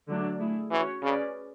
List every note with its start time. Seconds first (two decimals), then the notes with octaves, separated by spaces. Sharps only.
0.08 D3 F#3 A3 D4
0.39 A3 E4 G#4
0.71 E3 C#4 F#4 C#5
1.02 C#3 C#4 G#4 B4 D5